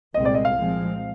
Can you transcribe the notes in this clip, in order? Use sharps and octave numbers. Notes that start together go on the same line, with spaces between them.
C2 A#2 G#3 C4 D#5
D5
D#5
F5
A#2 F3 G#3 C4